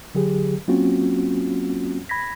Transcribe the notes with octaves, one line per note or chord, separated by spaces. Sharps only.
D3 F#3 G4 G#4
F#3 A#3 C4 C#4 F4 F#4
B5 G#6 A#6 B6